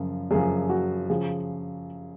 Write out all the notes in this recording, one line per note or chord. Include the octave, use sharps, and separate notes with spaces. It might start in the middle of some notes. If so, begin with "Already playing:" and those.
Already playing: F#2 C#3 F3
F#2 C#3 F3 G#4
F#4
C#3 F3 G#4